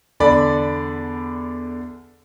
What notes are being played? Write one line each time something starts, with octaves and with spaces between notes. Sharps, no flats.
E2 D3 D5 B5